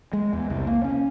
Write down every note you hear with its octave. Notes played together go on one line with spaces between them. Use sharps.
G#3
E2
C2
A#3
C#4